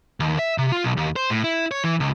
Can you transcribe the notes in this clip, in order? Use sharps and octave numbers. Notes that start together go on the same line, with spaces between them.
D#2
E5
C3
F4
B1
D#2
C5
A2
E4
C#5
E3
C#2